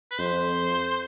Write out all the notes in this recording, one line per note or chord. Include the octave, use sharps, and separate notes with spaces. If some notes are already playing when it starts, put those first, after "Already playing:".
B4
F2 C5